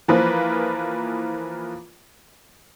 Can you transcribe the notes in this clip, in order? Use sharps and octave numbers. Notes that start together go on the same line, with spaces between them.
E3 F3 A#3 F4 B4